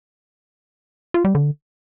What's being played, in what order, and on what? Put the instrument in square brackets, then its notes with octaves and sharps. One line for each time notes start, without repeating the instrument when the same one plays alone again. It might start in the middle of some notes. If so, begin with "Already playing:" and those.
[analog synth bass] F4
G3
D3